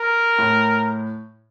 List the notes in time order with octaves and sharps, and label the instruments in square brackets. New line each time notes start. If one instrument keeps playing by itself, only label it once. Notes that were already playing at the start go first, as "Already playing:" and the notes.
Already playing: [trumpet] A#4
[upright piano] A2